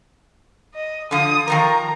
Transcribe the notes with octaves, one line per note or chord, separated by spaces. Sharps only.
D#5
D3 F3 D#6
D#3 F3 A#4 A#5